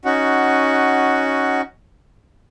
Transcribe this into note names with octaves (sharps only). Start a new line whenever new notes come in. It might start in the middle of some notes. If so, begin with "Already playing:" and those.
C#4 D#4 F#4 F#5